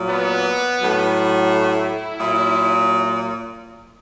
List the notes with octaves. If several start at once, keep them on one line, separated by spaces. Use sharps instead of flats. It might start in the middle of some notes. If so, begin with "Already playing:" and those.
Already playing: A#2 F#3
B3
A2 F#3
E4
A#2 F#3